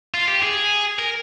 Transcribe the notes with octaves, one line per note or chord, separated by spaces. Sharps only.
F4
G4
G#4
A#4